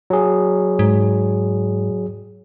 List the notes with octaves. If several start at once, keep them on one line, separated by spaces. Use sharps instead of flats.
F#3 G#4
G#2